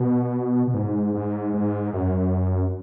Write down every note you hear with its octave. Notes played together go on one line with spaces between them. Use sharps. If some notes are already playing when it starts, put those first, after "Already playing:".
Already playing: B2
B2
G#2
G#2
G#2
F#2